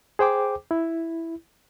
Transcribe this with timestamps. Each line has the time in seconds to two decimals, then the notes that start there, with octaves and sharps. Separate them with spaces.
0.19 G#4 C5 G5 D6
0.71 E4